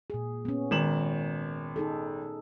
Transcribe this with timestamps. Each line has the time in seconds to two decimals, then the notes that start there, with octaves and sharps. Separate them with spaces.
0.10 A#2 G#4
0.45 B3 C#4
0.71 G#1 A#4 E7 F#7
1.76 D#4 G#4 A4